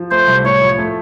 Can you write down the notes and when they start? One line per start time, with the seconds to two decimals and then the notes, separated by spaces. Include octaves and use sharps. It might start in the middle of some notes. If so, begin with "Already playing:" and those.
Already playing: F3
0.11 A3 C5
0.28 C2
0.44 A2 C#5
0.62 F3
0.78 A3